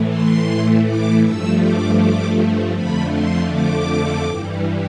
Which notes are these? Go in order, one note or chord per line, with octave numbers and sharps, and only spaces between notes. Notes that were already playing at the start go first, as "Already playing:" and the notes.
Already playing: A2 E3 A3
C6
D6
G2 F3 A3 E6
D6
D6
F2 D3 F3 A3 B5
C6
D6
G2 E3 G3